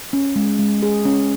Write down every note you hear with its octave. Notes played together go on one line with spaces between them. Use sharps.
C#4
G#3
G#3
G#4
C#4